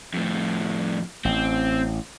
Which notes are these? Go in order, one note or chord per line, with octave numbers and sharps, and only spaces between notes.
F2 A2
A1 C4